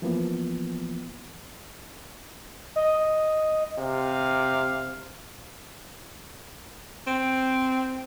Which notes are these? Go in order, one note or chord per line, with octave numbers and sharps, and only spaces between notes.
E3 F3 A#3 B3
D#5
C3 F5
C4